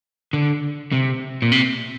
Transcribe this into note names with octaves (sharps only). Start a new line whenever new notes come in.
D3
C3
A#2
C3